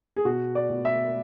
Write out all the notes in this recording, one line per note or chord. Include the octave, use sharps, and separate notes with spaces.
G#4
B2 F#4
D5
B2
E5